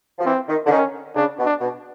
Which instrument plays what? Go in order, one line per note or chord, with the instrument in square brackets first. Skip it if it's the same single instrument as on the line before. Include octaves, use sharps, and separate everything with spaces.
[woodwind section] F3
[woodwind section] E3 [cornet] C4
[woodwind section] D#3
D3
[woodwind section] D#3 [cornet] C#4
[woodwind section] C#3 [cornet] D4
[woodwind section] B2
[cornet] D4
[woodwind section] B2